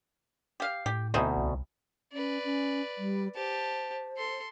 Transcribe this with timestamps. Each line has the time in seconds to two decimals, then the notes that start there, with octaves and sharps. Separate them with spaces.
0.60 G4 F5
0.86 A2 G4
1.14 D2 B2 C4 D#4 E4
1.38 C2
2.13 C#4 B4 D5
2.44 C#4
2.98 G3
3.36 G4 C5 A5
4.17 A4 C6